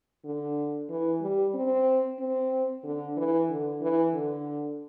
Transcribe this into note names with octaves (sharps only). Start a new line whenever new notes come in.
D3
E3
G3
C4
C4
D3
E3
D3
E3
D3